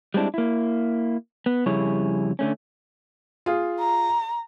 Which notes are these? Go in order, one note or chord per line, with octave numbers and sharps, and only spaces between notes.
G3 G#3 C4 D4 E4
A#3 E4
B3
F2 C#3 G3 E4 G#4 C#5
D3 A3 C#4
F4 G#4 F5
A#5